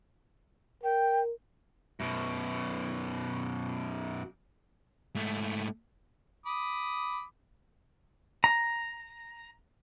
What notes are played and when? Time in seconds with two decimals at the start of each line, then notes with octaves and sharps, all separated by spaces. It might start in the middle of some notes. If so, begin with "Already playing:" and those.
0.83 A#4 G5
2.00 F#2 B2
5.15 G#2 A3
6.46 B5 D6 D#6
8.44 A#5